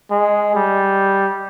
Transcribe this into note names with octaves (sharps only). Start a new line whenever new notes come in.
G#3
G3